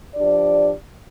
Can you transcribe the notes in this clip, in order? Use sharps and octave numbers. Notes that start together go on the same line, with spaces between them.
F3 D4 G4 D5